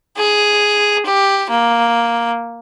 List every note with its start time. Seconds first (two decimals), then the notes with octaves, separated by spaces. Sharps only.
0.18 G#4
1.05 G4
1.50 A#3